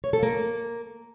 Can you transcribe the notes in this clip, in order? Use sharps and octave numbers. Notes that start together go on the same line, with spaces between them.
C#5
A4
A#3